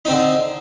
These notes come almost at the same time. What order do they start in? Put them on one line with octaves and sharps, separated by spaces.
D#4 C4 D3